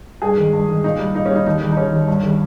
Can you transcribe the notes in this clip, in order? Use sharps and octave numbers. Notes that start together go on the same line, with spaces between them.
G2 G#4
D#3 G#3
G2
D#3 G#3
A#2 D#4
G3
A#2 D#4
C#4
G3
D#4
D#2 D#4
D#3 G3
D#4
D#2 C#4
D#3 G3
G2
D#3 G3